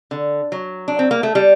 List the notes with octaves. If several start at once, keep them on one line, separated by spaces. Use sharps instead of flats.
D3
F#3
D4
C4
A#3
A3
G3